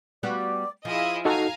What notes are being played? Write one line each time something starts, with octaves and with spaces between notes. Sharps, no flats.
G3 B3 F#4 D5
F3 E4 F4 G#4 D#5
D#4 F#4 A4 F5 G#5 A#5